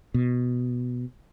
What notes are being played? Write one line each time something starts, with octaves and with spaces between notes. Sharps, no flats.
B2